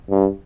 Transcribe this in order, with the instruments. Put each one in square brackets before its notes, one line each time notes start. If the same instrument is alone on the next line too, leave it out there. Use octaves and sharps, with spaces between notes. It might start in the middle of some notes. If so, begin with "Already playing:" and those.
[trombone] G2